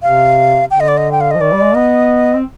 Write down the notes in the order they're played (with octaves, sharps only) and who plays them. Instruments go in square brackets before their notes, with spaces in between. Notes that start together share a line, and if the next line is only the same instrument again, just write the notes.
[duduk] C3 [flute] F5
[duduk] D3 [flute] G5
[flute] D#5
D5
D#5
G5
F5
[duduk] F3 [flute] D#5
[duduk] D#3 [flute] D5
[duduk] G3
G#3
[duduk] B3 [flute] D#5
[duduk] C4